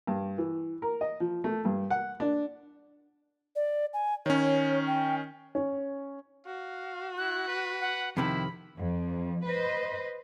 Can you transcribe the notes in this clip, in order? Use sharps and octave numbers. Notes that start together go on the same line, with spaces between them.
G2
E3
A#4
D#5
F3
A3
G2
F#5
D4
D5
G#5
D#3 C#4 C#5
G5
C#4
F#4 F5
E4 F#6
B4
F#5
F2 C3 D#3 E4 B5
F2
B4 C5 D#5